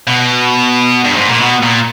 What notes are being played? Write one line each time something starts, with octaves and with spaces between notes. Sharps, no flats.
B2
G2
G#2
A#2
B2
A#2